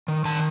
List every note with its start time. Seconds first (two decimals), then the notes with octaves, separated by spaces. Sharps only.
0.08 D#3
0.25 D#3 A5